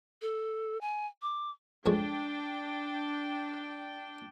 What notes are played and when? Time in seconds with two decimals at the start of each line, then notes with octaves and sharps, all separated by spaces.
0.22 A4
0.81 G#5
1.22 D6
1.86 F2 G#3 D4 C#5 G5